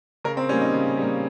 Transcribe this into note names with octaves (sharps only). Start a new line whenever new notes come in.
C#3 A#4
C4
G3 A#3 C#4
D#4
C#3
G3 A#3